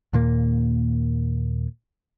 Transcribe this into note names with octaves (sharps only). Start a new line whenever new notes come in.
D#2 A#2 A#3